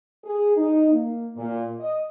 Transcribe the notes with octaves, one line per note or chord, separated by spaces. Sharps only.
G#4
D#4
A#3
A#2
D#5